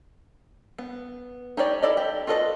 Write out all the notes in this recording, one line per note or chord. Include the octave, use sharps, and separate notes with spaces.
B3
D#4 G4 C#5 D5
E4 A4 D5 D#5
G4
F4 F#4 A4 B4 D#5